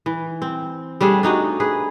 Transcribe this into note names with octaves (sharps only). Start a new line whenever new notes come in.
E3
C4
G3 A3 D4 G#4
D4 D#4 F#4 D#5
G#4 B4